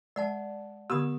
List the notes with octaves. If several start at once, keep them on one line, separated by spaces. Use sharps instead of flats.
G#3 D5 F#5 A5
D3 B3 G4 D#6 E6